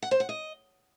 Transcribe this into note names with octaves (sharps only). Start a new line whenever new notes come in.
F#5
C5
F#5
D#5